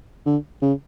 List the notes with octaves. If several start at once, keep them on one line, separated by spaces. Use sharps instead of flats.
D3
C#3